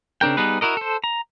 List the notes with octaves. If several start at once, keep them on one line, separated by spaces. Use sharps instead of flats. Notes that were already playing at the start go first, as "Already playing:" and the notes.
C#3 C4 D4 A#4 G5
G3 B3 D#4 G#4 B4
E4 F#4 A#4 D#5
A4 C5
A#5